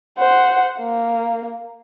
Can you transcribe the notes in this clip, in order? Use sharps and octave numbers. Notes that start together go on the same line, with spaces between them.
C5 F#5
A#3